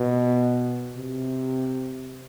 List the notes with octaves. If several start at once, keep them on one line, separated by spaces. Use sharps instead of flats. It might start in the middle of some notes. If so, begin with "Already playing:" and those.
Already playing: B2
C3